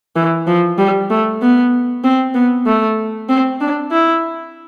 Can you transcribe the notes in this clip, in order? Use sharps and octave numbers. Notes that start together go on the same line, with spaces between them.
E3
F3
G3
A3
B3
C4
B3
A3
C4
D4
E4